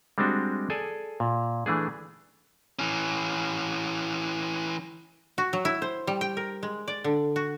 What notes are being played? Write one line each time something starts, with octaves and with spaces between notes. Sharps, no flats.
G3 G#3 C4 D4 F#4
G#4 A4 D5 G#5
A#2
E3 A3 D4 G#4
E3 C#4
F#4
F#3
E4
C5
G3
G5
A#4
G#3
D5
D3
F#4